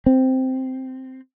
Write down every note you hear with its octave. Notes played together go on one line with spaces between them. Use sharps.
C4